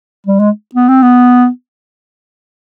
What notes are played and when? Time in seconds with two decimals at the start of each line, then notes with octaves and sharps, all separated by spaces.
0.27 G3
0.39 G#3
0.75 B3
0.88 C4
1.03 B3